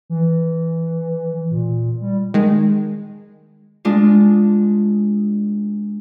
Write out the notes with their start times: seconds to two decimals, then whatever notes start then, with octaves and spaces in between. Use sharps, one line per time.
0.10 E3
1.51 A#2
2.01 G3
2.34 D#3 G#3
3.85 G#3 D4 F4